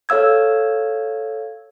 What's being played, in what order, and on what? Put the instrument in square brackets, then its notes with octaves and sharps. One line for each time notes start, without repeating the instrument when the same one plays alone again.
[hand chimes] A4 C#5 F5 E6 G#6